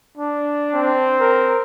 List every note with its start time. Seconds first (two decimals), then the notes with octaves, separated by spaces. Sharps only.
0.17 D4
0.74 C4
1.20 A#4